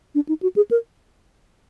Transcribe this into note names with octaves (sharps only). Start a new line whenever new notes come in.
D4
D#4
F#4
G#4
A#4